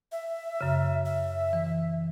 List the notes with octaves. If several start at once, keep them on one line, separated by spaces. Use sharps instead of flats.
E5
F#2 C#3
E5
E3